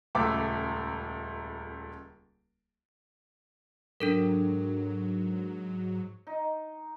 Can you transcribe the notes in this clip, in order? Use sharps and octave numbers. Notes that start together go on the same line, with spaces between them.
D#1 C#2 A3 E5 D6
G#2 F#3 D4 A4 A#4
D#4